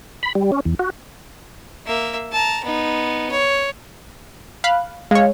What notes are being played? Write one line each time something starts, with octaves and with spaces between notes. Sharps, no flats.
B5
G3
C#4
E2
F#4
A#3 E5
A5 A#5
B3 D#4
C#5
F5 B5 F#6
G#3 C#5 F5